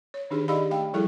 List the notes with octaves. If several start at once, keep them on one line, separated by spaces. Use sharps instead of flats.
C#5
D#3 D4 D#4 G4 G#4
D#4 G4 D5 D#5 F5 B5
A3 F5 G5
F3 G3 E4 G#4 A4